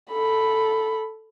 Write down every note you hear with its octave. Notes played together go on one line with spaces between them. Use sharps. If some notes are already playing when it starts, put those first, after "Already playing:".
A4 B5